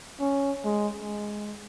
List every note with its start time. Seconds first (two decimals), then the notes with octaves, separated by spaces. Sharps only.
0.20 C#4
0.64 G#3
1.00 G#3